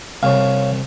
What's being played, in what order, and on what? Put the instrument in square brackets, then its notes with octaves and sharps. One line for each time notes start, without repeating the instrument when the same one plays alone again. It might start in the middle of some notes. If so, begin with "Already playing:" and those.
[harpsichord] C2 [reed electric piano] C#5 F5